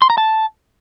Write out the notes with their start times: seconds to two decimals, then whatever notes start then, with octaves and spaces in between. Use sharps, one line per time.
0.02 C6
0.10 A#5
0.18 A5